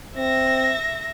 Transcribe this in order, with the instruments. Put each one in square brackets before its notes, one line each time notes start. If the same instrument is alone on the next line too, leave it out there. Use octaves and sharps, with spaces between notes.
[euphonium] C4 [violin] E5 A#6